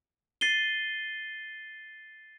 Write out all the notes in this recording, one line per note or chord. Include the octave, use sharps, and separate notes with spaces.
A6 C7 D#7 G7